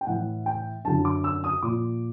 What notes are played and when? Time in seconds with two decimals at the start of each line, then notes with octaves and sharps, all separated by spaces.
0.01 G5
0.07 A2 E3 F#5
0.46 G5
0.85 F#2 D3 F#3 A5
1.05 D6
1.24 E6
1.44 D#6
1.63 A#2 F3 D6